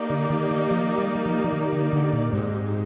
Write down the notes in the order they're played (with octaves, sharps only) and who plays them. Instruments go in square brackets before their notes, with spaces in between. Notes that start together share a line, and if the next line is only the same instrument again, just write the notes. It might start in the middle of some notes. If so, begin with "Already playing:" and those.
Already playing: [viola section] A#3 D#4 G4 D5
[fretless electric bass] D3
D#3
D#3
F3
G3
G3
F3
F3
D#3
D3
D3
A#2
[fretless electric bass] G#2 [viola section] G#3 C4 D#4 G4